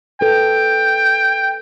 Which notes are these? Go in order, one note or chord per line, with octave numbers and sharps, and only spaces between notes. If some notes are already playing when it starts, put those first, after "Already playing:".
A4 B4 G5